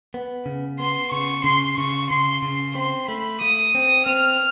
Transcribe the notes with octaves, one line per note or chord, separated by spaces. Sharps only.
B3
C#3
B3 C6
C#3 C#6
C#3 C6
C#3 C#6
C#3 C6
C#3
C4 C6
A3 B5
A3 D#6
C4
C4 F6